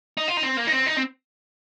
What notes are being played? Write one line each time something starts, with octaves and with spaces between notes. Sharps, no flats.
D#4
F4
D#4
C4
A#3
D#4
C4
D#4
C4